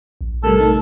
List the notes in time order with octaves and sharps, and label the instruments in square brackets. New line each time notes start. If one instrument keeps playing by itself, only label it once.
[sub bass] A#1
[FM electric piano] A2 C3 G3 [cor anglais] A4 [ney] A#4
[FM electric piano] C3 A3 D#4